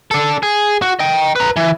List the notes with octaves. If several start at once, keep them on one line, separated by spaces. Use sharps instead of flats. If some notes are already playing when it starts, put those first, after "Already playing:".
D4 A4
G#4
F#4
D#5 G5
B4 A#5
E3